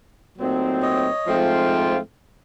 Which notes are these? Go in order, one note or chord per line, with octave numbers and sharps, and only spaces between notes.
A#2 F#3 A3 C4 D#4
C#5 D#5
G#2 F3 A3 C4 F4